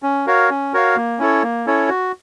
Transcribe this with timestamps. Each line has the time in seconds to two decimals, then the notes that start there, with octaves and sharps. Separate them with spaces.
0.03 C#4
0.26 F#4 A#4 C#5 F5
0.50 C#4
0.73 F#4 A#4 C#5 F5
0.96 A#3
1.19 C#4 E4 A4 C#5
1.43 A#3
1.66 C#4 E4 A4 C#5
1.89 F#4